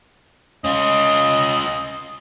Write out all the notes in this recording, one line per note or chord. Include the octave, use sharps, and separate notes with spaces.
C#4 F4 D#5